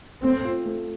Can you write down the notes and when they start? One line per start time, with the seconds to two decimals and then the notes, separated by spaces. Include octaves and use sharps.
0.23 A3 C4
0.45 F4
0.66 A3